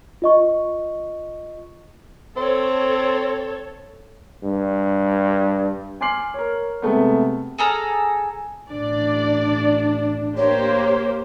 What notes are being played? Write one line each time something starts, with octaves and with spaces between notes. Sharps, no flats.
F4 D#5 C#6
C4 A4 C#5
G2
G#5 C6 D6 F6 C7 F#7
A#4 C#5
C3 G#3 A3 B3
G#4 A4 A#5 F6
A1 D4 D5
A#3 G4 C5 C#5